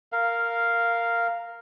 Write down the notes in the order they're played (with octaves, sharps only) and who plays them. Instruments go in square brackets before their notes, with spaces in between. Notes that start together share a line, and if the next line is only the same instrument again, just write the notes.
[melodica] A#4 F5